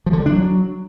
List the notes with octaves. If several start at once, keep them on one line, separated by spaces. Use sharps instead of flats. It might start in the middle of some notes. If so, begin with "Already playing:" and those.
F3
D3
G3
D4
F#3